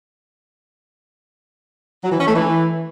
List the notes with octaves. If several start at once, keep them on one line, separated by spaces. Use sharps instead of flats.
F#3
E3
C#4
A3
E3